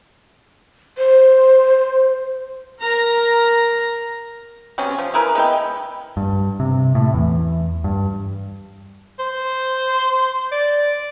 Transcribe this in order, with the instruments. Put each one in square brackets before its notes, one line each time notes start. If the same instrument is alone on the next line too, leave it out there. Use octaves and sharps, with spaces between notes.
[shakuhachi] C5
[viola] A#4 A#5
[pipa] C3 F#3 B3 C#4
F3
E4 G#4 A#4 B4
G#3 B3 E4 G5
[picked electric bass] G2
C3
A2
E2
G2
[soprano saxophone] C5
D5